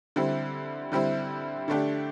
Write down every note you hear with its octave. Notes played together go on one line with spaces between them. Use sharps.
D3 G3 C4 E4
D3 G3 C4 E4
D3 A3 D4 G4